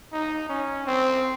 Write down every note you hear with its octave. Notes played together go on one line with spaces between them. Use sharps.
D#4
C#4
C4